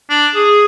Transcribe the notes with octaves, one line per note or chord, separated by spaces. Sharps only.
D4
G#4